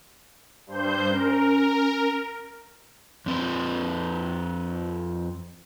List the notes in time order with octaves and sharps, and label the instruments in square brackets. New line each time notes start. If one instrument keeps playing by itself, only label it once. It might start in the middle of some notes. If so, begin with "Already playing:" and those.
[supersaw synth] G2 C5 G6
[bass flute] C#4 [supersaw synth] A#4
[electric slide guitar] F2 C4 B4